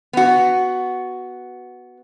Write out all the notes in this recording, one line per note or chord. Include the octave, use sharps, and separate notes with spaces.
B3 F#4